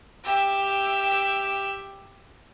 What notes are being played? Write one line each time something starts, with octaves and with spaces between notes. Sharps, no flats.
G4 E5